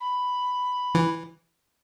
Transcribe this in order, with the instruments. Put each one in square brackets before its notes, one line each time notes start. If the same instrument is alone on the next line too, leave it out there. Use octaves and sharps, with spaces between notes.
[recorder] B5
[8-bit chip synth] E3